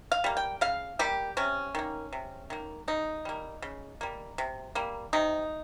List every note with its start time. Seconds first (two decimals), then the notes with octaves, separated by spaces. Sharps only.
0.12 F5
0.24 G3 A#3
0.37 G5
0.61 C#3 F5
0.99 G3 A#3 G4
1.37 C3 C#4
1.75 D#3 A#3
2.13 C3
2.50 D#3 A#3
2.88 C#3 D#4
3.25 G3 A#3
3.62 C#3
4.01 G3 A#3
4.38 C3
4.75 G3 A#3
5.13 C3 D#4